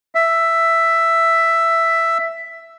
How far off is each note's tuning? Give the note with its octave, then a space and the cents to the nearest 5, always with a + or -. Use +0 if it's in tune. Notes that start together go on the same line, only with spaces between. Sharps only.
E5 +5